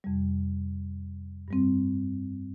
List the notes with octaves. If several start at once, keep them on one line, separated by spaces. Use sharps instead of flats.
F2 C3 G3
G2 G3 C4